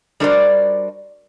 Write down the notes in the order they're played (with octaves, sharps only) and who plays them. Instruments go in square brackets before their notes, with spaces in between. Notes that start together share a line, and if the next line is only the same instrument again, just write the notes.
[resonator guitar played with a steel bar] G3 D4 F#4 A#4 C5 D5